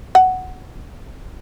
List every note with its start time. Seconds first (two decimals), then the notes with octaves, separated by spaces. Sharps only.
0.15 F#5